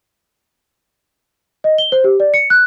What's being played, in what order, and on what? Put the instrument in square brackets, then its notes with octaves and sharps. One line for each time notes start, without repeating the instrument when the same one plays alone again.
[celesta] D#5
G7
C5
G4
D5
C#7
F#6